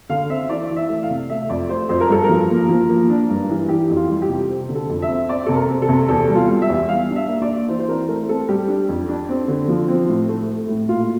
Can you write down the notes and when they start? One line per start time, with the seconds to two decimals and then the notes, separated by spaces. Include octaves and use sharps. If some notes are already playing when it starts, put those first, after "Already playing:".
0.09 D3 F5
0.29 C4 E5
0.49 E3 D5
0.70 E3
0.76 E5
0.89 A3
1.03 F5
1.10 C3
1.29 A3 E5
1.49 F2 D5
1.69 A3 C5
1.89 F2 C5
2.00 A#4
2.09 G2 A4
2.24 A#4
2.29 F3
2.50 A#3
2.69 F3
2.89 A#3
3.09 D4
3.29 G2
3.49 E3
3.69 E3 G4
3.89 F2
3.96 F4
4.09 G3
4.22 G4
4.29 C3
4.48 C4
4.69 D3
4.75 A4
4.89 F2
5.02 E5
5.09 C4
5.29 C4 D5
5.46 C3 A4
5.56 A#4
5.69 C4
5.82 A4
5.89 C3
6.08 E2 A4
6.29 G3
6.35 F4
6.49 G3
6.62 E5
6.69 E2
6.89 G3 F5
7.09 D4
7.16 E5
7.28 A#3
7.42 D5
7.48 A#3
7.69 E3 C5
7.79 C5
7.88 C4 A#4
8.08 A3 A#4
8.29 C4 A4
8.49 G3 G4
8.68 D4
8.88 F2
9.08 D4
9.29 C4
9.48 D3
9.68 F3
9.88 C4
10.08 A2
10.29 A3
10.49 A3
10.68 A2
10.88 A#2 F4